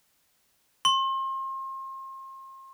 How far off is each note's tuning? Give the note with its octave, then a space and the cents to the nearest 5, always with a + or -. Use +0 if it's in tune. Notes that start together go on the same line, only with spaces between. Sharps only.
C6 +35